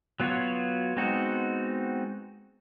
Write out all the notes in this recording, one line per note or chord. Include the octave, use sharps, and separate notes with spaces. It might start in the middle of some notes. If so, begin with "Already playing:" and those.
F#3 B3 F4 F#4 C#5
G#3 B3 C4 D#4 F#4